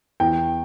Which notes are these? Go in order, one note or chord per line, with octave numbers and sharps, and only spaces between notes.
E2 G5